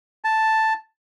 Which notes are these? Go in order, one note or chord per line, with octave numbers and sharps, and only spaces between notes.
A5